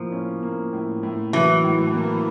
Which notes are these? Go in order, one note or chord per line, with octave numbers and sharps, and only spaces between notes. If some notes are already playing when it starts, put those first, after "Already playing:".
Already playing: A2 F3 A#3
C#4
A#3
A2
A2
E3 F#3
A2
A#3